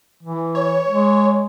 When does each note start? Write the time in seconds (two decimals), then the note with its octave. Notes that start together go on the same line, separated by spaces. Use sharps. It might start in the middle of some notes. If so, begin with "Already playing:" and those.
0.23 E3
0.55 C#5
0.87 G#3